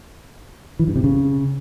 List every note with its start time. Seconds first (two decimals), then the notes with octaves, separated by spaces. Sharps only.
0.79 E3
0.88 G2
0.96 C3
1.04 C#3